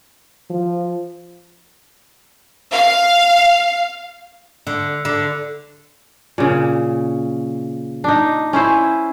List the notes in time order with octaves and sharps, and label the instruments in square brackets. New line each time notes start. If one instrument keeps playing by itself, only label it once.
[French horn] F3
[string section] F5
[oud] D3
D3
[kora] A#2 C#3
D4 D#4
C#4 E4 C5